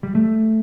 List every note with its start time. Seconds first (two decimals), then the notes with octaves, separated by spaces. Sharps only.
0.03 G3
0.15 A3